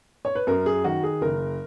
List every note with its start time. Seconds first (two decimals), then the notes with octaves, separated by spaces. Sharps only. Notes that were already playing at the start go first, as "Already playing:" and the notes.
0.25 C#5
0.35 B4
0.47 F#2 A#4
0.66 G#4
0.84 D#3 F#4
1.03 G#4
1.21 F#1 A#4